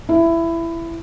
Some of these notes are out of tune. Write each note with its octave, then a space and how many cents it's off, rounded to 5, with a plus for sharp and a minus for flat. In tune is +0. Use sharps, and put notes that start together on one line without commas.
E4 +15